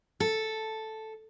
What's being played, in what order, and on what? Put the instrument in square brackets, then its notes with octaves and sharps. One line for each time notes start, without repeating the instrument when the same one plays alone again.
[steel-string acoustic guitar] A4